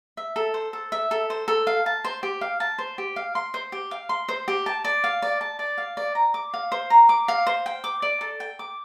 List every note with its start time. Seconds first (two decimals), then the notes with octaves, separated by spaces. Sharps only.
0.17 E5
0.36 A4
0.54 C5
0.73 A4
0.92 E5
1.11 A4
1.30 C5
1.48 A4
1.67 F5
1.86 A5
2.05 C5
2.23 G4
2.41 F5
2.60 A5
2.78 C5
2.98 G4
3.16 F5
3.35 C6
3.54 C5
3.72 G4
3.91 F5
4.09 C6
4.29 C5
4.48 G4
4.66 A5
4.85 D5
5.04 F5
5.22 D5
5.41 A5
5.59 D5
5.78 F5
5.97 D5
6.15 A#5
6.34 D6
6.54 F5
6.72 C5
6.90 A#5
7.09 D6
7.28 F5
7.47 C5
7.66 G5
7.84 D6
8.02 D5
8.21 A4
8.40 G5
8.59 D6